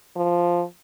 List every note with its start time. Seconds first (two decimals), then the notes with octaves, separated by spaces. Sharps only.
0.16 F3